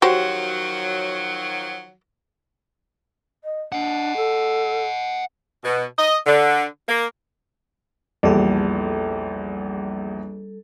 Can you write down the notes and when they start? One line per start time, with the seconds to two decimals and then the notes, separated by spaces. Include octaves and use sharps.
0.02 D#3 F3 F#3 F#4 G4 C5
3.44 D#5
3.72 D4 D#5 F#5
4.16 A4
5.64 B2
5.99 D#5
6.27 D3
6.89 A#3
8.23 A#1 E2 G3 A4